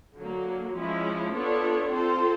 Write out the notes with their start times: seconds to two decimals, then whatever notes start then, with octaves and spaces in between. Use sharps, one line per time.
0.17 D3 F#3 A#3
0.75 F3 G#3 C#4 E4
1.33 B3 D4 F4 A4 C#5
1.91 C4 F4 A4 C5